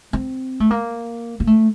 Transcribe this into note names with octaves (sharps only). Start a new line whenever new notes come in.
C4
A3
A#3
A#3
A3